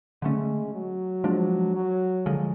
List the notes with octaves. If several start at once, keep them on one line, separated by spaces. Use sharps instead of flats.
D3 F#3 G#3 A3 C#4
F#3
F3 G#3 D4
F#3
D3 F3 G#3